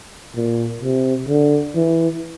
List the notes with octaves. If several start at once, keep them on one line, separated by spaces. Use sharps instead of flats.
A#2
C3
D3
E3